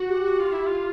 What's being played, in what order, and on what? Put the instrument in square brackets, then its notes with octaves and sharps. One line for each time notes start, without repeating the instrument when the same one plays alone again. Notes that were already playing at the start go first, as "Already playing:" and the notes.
Already playing: [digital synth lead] F#4
[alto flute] G4
[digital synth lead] F4
E4
F4